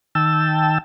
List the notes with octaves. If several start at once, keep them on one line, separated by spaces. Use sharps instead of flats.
D#3 G5 A5 E6